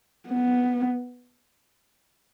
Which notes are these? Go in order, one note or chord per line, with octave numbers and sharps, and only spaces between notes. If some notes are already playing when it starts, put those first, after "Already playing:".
B3